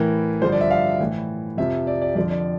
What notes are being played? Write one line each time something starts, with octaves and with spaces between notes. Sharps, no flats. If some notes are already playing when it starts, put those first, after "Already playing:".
Already playing: A2 E3 A#4
G2 D3 F3 C5
D5
E5
F5
A2 E3
F2 C3 F3 E5
D5
D5
F2 D3 F3 D5
D5